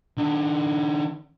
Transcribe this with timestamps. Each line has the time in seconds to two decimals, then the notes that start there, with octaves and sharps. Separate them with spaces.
0.17 D#3 D4